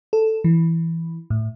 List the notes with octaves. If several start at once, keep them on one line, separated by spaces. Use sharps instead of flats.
A4
E3
A2